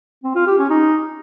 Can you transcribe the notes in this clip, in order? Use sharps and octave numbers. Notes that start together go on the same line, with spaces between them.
C4
F4
G4
C#4
D#4